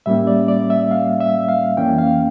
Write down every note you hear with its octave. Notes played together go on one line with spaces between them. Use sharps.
A2 G3 A#3 C#4 E5
D5
D5
E5
F5
E5
F5
F2 E3 A#3 C#4 G5
F5